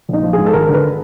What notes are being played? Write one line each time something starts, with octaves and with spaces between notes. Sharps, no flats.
A#1 D#4
F3
G#2 G#4
A4
G#1 A#4
D3 B4